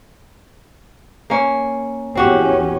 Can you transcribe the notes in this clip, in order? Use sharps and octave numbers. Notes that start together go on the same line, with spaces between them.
A#3 C#4
E2 C4 C#4 F#4 G4